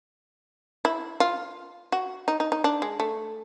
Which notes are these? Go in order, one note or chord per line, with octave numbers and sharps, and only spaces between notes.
E4
F4
F#4
D#4
D#4
D#4
D4
G#3
A3